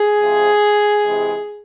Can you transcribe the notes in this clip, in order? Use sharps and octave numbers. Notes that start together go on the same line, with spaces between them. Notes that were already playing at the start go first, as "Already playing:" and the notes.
Already playing: G#4
C3 F3 G#3
C3 E3 G#3